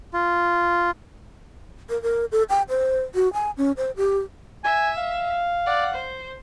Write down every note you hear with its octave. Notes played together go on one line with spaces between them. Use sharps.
F4
A#4
A#4
A4
G5
C5
F#4
G#5
C#4
C5
G4
E5 G#5
F5
D5 F#5
C5